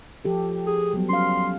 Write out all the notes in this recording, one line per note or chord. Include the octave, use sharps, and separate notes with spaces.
F3 G4 A4
G#4
F#3 G3 B3
C#4 F5 C6